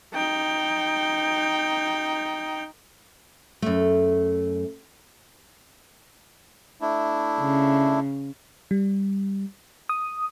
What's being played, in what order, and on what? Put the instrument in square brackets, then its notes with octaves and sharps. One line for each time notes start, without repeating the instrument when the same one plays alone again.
[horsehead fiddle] D#4 G5
[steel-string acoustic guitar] F#2 A3
[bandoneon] A3 D4 E4
[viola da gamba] C#3
[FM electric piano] G3
D#6